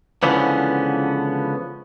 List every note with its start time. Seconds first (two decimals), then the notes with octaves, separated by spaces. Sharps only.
0.23 C#2 D3 E3 F3 B3 C#4